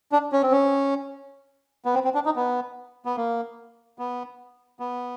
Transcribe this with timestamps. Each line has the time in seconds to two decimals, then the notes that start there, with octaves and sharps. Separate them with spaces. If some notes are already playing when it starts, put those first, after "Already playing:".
0.12 D4
0.32 C#4
0.43 C4
0.52 C#4
1.85 B3
1.94 C4
2.04 C4
2.15 D4
2.25 D#4
2.36 B3
3.05 B3
3.17 A#3
3.99 B3
4.80 B3